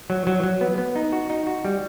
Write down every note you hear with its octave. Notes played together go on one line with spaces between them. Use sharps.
F#3
F#3
F#3
B3
B3
D#4
F#4
D#4
F#4
G3